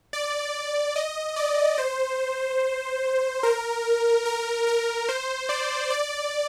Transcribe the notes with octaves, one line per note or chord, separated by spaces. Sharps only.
D5
D#5
D5
C5
A#4
A#4
A#4
C5
D5
D5